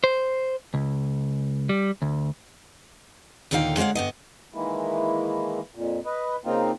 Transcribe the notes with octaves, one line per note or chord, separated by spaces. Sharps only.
C5
C#2
G3
D2
D#2 A#2 D3 D#4 F5 G5
G#3 A#3 C#5 F5 F#5
G2 B3 D#5
D#3 E3 G#3 A#3 E4
F2 A#2
B4 D#5
C#3 A#3 C4 D#4 F4